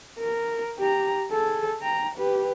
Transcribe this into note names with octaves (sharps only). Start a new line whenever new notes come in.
A#4
G4 A#5
G#4 A4
G5 A#5
G4 B4